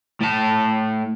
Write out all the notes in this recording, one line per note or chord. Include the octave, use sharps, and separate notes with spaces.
A2 A5